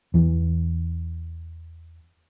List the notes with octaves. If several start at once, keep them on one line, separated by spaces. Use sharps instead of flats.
E2 E3